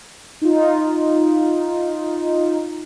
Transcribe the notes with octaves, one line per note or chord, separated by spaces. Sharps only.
D#4 F4